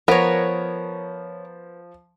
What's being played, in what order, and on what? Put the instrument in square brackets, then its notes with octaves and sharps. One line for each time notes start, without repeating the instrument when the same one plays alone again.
[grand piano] F3 [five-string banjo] B3 [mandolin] A#4 C#5